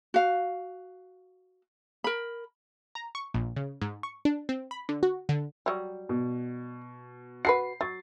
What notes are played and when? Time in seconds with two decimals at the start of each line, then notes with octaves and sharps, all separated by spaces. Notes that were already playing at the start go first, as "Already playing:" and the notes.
0.14 F#4 F5
2.04 A#4 B5
2.95 A#5
3.15 C#6
3.34 A#1
3.56 C#3
3.81 G#2
4.03 C#6
4.25 D4
4.49 C4
4.71 B5
4.89 D3
5.03 F#4
5.29 D3
5.66 F#3 G3
6.09 B2
7.45 F#4 A4 B4 C7
7.81 F#3 A6